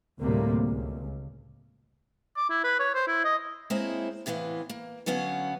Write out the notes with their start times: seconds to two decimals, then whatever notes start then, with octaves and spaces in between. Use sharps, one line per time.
0.20 D2 A2 C3 G3 A#3
0.69 C#2
2.37 D6
2.50 E4
2.64 B4
2.80 C#5
2.94 C5
3.08 E4
3.25 D#5
3.70 G#3 A#3 C4 E4 C5 C#5
4.26 A2 C3 E3 B3 F5
4.69 A#3
5.06 D3 F#3 B3 C#4 F5